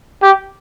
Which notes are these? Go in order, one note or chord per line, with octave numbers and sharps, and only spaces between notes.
G4